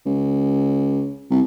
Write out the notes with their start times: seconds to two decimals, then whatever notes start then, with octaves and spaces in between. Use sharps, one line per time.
0.06 C#2
1.31 C2